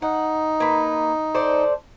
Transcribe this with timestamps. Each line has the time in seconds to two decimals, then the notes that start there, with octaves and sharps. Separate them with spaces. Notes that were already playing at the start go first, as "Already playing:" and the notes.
0.02 D#4 F#5
0.60 A#3 B4
1.35 A4 C5 D5